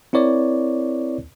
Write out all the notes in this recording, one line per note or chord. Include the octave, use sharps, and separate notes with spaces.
C4 E4 A#4 C#5 D5